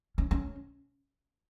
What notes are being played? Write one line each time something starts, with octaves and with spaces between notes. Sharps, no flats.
C#4
C#4